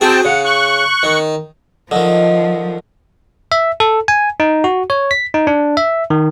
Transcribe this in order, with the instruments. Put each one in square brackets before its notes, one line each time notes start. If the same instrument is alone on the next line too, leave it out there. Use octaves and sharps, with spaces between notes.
[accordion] C4 G5 A5 [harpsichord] F#4 G#4
[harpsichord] C#3 [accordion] F#5
[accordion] C#6 F#6
[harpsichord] D#3
[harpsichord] D3 D#3 [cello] F3 [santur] D#5
[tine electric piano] E5
A4
G#5
D#4
F#4
C#5
B6
D#4
D4
E5
D#3